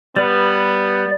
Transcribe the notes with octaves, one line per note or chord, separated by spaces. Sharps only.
G3 B3 B4 D5